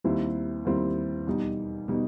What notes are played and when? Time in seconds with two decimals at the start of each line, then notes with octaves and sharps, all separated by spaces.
0.04 D#2 D#3 G3 C4 E4
0.65 D#2 D#3 G3 C4 E4
1.27 E2 B2 G3 D#4
1.88 B2 G3 D#4